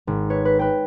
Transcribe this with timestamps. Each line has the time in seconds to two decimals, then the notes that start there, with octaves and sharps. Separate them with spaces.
0.07 G#1
0.30 B4 C#5
0.45 B4
0.59 B4 G5